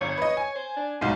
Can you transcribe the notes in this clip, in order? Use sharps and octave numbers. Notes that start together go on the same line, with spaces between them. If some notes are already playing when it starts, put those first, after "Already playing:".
G1 C#5
B4 D#5
G#5
C5
D4
B1 G#2 C6